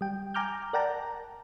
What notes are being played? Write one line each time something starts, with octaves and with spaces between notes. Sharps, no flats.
G3 G5
G5 G#5 A#5 D6 F6 G6
A#4 D5 F#5 G5 A5 A#5